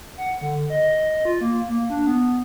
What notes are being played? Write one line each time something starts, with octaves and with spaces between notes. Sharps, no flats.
F#5
D3
D#5
D#5
F4
A#3
A#3
D4
B3